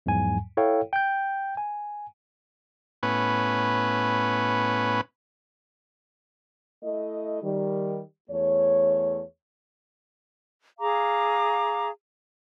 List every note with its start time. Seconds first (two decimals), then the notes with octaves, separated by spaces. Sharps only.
0.06 E2 G#2 F3 F#3 G#5
0.57 E4 A4 C#5 F5 G5
0.93 G5 G6
1.57 G#5
3.03 A2 B3 C#4 B4
6.83 A3 E4 D#5
7.42 D#3 G3
8.29 E2 A3 C#5
10.79 G#4 F5 A#5 D6